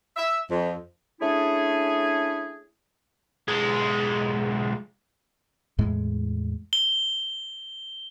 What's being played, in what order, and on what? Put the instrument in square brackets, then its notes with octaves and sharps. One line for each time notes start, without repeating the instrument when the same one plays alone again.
[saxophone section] E5
F2
[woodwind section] A3 C#4 D4 E4 G#4
[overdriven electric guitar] B1 G#3
[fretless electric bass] E2 A2 G#3
[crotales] G7